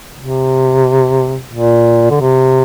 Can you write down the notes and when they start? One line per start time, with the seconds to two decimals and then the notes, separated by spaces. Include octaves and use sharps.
0.20 C3
1.53 A#2
2.11 D3
2.20 C3